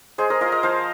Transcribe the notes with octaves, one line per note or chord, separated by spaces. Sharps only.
G#3 G#4 C5
A#4 D#5
F4 A#4 D#5
A#4 D#5
F3 C5 F5